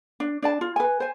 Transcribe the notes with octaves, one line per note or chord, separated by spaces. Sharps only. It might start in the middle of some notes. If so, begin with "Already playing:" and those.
D4
D4 D5 A5
F4
B4 G#5
C5 G#5